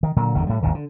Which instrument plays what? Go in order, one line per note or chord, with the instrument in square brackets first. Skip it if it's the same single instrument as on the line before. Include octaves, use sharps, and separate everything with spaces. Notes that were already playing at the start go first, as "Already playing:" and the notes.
[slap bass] D#3
A#2 D3 F#3
G1 E2 D3 D#3
A2 G3
G#1 D#2 A#2 D3
D3